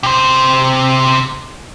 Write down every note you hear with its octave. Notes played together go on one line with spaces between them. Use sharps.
C3 C5